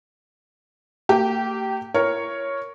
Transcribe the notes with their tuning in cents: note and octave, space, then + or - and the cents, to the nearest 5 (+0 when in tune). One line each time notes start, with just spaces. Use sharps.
A#3 -45 G4 -20 G5 +0
E4 +35 A#4 +0 C#5 +0